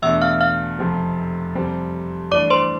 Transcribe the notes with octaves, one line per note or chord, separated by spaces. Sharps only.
E2 B2 A3 D4 E5 E6
F5 F6
F5 F6
F1 F2 C3 F3
F2 C3 G3 C4
G2 E3 A3 D4 D5 D6
C5 C6